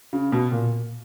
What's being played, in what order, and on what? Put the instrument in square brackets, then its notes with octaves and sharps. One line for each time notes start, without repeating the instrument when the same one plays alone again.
[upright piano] C#3
B2
A#2